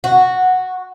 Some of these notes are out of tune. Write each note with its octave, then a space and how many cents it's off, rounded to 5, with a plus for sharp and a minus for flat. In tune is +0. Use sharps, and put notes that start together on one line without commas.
F#4 -5